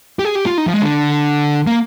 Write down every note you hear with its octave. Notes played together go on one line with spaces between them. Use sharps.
G4
G#4
G4
F4
D#4
F3
G#3
D3
A#3